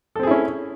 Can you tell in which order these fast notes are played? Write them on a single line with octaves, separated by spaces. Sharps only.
A4 C4 G#4 E4 C#4